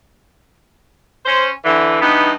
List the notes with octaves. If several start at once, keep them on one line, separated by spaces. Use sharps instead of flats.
C#4 C5
D3 E3
G2 E3 B3 D#4